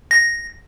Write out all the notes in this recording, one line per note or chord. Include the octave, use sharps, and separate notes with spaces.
A#6